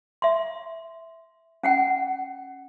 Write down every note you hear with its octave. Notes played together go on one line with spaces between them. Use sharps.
E5 C6
C#4 F#5 G5